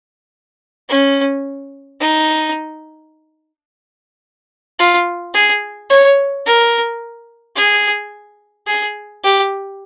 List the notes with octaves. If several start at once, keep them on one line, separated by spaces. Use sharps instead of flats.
C#4
D#4
F4
G#4
C#5
A#4
G#4
G#4
G4